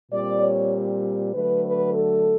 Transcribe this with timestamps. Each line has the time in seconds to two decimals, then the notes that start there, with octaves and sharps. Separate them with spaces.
0.12 A#2 G3 C4 D5
0.41 C#5
1.33 D3 F#3 A3 B4
1.64 B4
1.94 A4